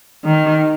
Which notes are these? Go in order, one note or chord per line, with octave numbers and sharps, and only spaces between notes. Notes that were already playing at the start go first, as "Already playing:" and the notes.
D#3